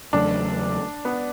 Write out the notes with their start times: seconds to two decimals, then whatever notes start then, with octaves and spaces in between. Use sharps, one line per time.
0.13 E2 C#3 F#3 A3 D4
1.05 B3